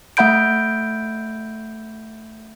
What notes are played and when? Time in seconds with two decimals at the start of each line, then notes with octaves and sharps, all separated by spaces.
0.17 A3 E5 F#5 B5 G6 D7